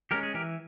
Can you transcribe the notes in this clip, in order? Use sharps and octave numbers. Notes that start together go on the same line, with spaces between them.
G#3 C#4 G4 A#4
G#4
E3 G4 A#4